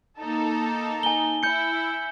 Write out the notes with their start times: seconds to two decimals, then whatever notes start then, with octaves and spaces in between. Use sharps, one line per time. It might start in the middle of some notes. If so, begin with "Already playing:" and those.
0.19 A#3 D#4 A4
1.03 G#5 G7
1.43 E4 G6 C#7